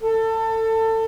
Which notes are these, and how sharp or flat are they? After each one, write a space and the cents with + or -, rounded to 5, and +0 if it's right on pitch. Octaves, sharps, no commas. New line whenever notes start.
A4 +25